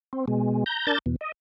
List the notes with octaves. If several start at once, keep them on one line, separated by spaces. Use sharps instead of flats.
C4
B2 G#3
A#5 G6
D4 A#4 A5 G6 A6
E2 B2
D#5